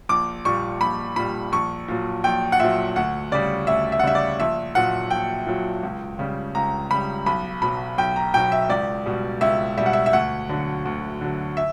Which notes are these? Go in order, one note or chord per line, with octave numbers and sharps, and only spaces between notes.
A#1 D6
A#2 G3 C#6
A#1 B5
A#2 G3 B5
A#1 C#6
A#2 F#3
A#1 G5
F#5
A#2 F#3 E5
D2 F#5
C#3 G3 D5
D2 E5
E5
F#5
C#3 G3 E5
D5
A#1 E5
A#2 F#3 F#5
A#1 G5
A#2 F#3
C#2
C#3 G3
C#2 A#5
C#3 G3 B5
B1 B5
B2 F#3 B5
B1 G5
A#5
B2 F#3 G5
E5
C#2 D5
B2 G3
C#2 E5
B2 G3 E5
F#5
E5
E5
D2 F#5
D3 F#3
D2
D3 F#3
E5